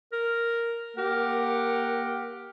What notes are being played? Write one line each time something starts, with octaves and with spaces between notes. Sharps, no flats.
A#4
A#3 G4 A#4 F#5